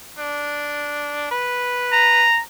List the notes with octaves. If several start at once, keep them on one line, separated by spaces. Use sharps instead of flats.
D4
B4
A#5